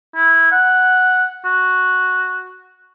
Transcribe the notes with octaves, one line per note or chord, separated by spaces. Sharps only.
E4
F#5
F#4